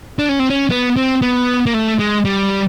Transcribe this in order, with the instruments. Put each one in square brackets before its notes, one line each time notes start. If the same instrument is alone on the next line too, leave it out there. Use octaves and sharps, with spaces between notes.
[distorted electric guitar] D4
C#4
C4
C#4
B3
C4
B3
A#3
A3
G#3
G3